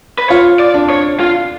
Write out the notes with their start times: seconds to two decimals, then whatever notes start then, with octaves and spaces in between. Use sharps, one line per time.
0.18 B4
0.29 F4 C#5
0.59 D5
0.74 D4
0.90 C#5
1.20 F4